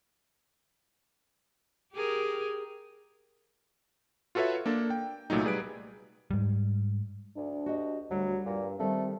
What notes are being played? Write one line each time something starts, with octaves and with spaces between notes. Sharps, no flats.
G4 G#4 A#4
F4 F#4 A4 B4 C#5 E5
A#3 D4 A4
G5
C2 A#2 F#3 A3 D#4
G3 G#4 B4 D7
G#2 G3
D2 D4
F#4 G4 D#5
D2 F#3 G3
G2 A#2
D#3 G3 A3 C4 A#4